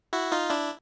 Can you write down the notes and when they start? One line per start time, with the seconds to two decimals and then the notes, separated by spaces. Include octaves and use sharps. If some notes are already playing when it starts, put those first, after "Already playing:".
0.13 E4 F#4
0.32 D#4 F4
0.50 D4 E4